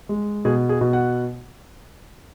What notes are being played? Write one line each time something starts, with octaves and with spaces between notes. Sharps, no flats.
G#3
B2 G#4
G#4
B2
F#5